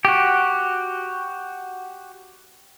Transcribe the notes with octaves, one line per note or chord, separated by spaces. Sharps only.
F#4 G4